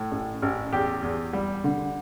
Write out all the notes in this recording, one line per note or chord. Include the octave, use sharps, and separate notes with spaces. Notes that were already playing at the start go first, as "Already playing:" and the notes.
Already playing: A2
A1
A1
E2 G4
E2
G3
D3